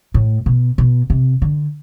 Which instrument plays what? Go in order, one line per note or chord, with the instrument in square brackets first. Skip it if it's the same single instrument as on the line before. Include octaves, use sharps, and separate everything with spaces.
[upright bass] A2
B2
B2
C3
D3